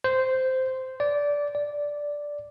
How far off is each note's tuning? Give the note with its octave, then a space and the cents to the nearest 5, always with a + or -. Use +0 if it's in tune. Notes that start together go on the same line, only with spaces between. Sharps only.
C5 -10
D5 -15
D5 -5